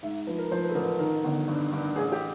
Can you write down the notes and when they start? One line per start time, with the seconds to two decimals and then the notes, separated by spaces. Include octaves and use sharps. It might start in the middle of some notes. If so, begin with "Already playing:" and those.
0.02 G#2 E5
0.27 F3 B4
0.38 A#4
0.51 F3 C5
0.63 B4
0.69 A4
0.75 A1 A#4
0.87 B4
0.99 D#3 A#4
1.24 G1
1.48 G2
1.72 G2
1.96 A1 G#4
2.12 G4